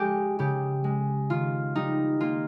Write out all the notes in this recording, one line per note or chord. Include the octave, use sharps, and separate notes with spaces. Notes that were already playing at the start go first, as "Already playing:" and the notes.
Already playing: G#3 G4
C#3 G4
G#3
D#3 F4
G3 D#4
A#3 F4